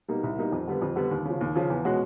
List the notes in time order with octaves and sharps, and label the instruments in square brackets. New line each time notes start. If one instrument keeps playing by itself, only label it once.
[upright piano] B2 G3 A#3 D#4
C2
B2 G3 A#3 D#4
F2
D3 G3 B3
F2
D3 G3 B3
D#2
C#3 F3
D#2
C#3 F3
E2
B2 G#3 C#4 F#4